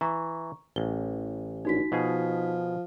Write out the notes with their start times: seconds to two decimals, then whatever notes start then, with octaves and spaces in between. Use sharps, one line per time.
0.01 E3 A#5 C#6
0.76 A1 G7
1.65 A#1 D#4 F#4 B6
1.92 B2 F3 G#4